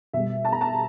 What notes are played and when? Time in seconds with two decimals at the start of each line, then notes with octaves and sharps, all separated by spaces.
0.14 B2 G3 E5
0.45 A5
0.52 A#5
0.61 A5